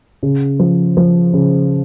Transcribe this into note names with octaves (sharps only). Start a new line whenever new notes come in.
C#3
F3
F3
C#3